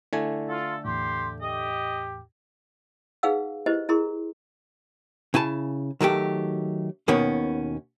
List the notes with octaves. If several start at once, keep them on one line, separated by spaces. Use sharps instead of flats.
D3 A3 E4 D5 G#5
F4 A4
E2 A2 G4 C6
G4 D#5
D#4 G#4 B4 F5 F#5 E6
E4 G4 B4 C5 D#5
E4 G#4 A#4 A#5 C6
C#3 E4 G#5 A5
D#3 F#3 A3 G4
D#2 B2 D#3 B3 C#4